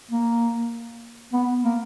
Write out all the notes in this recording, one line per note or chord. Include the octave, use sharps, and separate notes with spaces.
A#3
B3
A#3